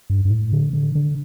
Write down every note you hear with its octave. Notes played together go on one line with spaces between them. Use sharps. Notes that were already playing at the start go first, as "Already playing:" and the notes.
G2
G2
A2
D3
D3
D3